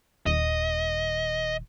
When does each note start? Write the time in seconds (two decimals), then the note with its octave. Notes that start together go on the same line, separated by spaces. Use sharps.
0.26 D#1 D#5